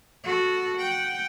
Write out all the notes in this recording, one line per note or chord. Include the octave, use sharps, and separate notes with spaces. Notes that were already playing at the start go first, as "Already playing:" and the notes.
F#4 A4
F#5 G5